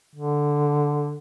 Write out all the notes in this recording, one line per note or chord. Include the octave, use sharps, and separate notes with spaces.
D3